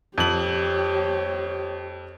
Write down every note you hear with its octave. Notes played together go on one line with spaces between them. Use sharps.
F2 G4 C#5 F#7